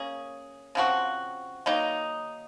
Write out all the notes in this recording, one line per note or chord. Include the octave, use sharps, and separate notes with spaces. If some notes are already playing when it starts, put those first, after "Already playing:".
Already playing: A#3 C#4 G#4
C#3 F3 C4 F#4
D#3 F#3 A#3 D#4